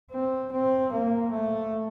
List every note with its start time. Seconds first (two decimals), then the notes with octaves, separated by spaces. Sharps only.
0.11 C4
0.52 C4
0.92 A#3
1.31 A3